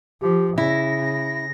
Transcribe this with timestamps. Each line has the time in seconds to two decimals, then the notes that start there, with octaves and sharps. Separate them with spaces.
0.21 F3 G4
0.58 C#3 E4 A#6